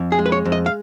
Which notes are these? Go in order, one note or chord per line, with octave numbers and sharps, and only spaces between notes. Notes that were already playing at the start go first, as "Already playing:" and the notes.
Already playing: F2
G#4
G#3
B4
C#5
F2
D#5
F5